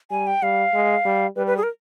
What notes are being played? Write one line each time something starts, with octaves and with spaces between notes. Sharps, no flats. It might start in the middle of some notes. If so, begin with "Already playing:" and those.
G3 G#5
G5
G3 F5
G#3
G3
G3 B4
B4
G#4
A#4